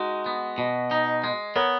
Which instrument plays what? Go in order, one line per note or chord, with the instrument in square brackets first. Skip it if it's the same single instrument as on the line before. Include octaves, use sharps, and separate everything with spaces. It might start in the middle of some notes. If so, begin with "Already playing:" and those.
Already playing: [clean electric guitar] G#3 D#4 [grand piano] F#4
[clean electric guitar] B3
B2
D#4
G#3
[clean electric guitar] B3 [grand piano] A#4 C#5